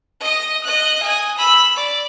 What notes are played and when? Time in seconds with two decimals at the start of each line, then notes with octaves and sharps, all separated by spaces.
0.21 D#5 D#6
0.63 D#5 F#6
1.03 G#5 D#6
1.38 B5 E6
1.76 D5